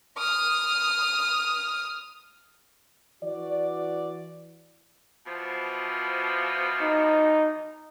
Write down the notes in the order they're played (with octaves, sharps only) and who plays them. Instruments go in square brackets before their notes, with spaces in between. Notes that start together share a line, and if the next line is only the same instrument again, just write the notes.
[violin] D#6 F6
[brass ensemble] E3 F#4 D5
[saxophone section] B2 E3 F3
[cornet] D#4